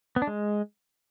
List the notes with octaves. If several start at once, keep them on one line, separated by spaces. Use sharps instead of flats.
B3
D4
G#3